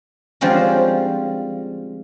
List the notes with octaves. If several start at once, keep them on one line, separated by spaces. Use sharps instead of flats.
D3 F3 G3 G#3 C4 C#4